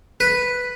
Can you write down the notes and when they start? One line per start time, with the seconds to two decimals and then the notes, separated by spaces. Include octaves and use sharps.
0.20 B4